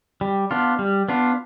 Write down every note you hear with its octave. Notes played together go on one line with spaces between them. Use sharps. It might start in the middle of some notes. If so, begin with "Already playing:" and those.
G3
B3 D4 F4
G3
B3 D4 F4